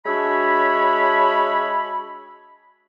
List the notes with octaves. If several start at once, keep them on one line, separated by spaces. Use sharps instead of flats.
G#3 D4 F#4 C#5 E5 B5